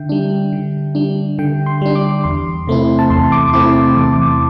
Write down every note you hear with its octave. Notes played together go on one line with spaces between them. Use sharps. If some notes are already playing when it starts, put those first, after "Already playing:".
Already playing: D3 E5 G5
G3 D4
D3
G3 D4
D3 G5
C6
G3 D4
D6
E2 C6
C3 A3 C4 E4
A5
E2 C6
D6
C3 A3 C4 E4 D6
A5
E2 D6